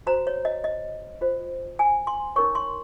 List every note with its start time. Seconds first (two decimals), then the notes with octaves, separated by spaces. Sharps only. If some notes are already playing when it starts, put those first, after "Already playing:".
0.07 F#4 C5 A#5
0.27 C#5
0.45 D#5
0.64 D#5
1.21 F4 C5
1.79 G#5
2.07 C6
2.36 D#4 A#4 C#5 C#6
2.55 C6